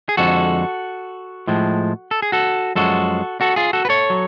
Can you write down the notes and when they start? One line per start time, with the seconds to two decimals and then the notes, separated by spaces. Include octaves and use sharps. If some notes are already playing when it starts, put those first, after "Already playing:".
0.09 G#4
0.17 F2 D3 F3 G#3 F#4 A4
1.47 A2 F3 G#3
2.11 A4
2.22 G#4
2.32 F#4 A4
2.75 F#2 F3 G#3 F#4 A4
3.41 F#4 A4
3.56 F4 G#4
3.73 F#4 A4
3.85 B4
3.89 A4 C#5
4.10 F#3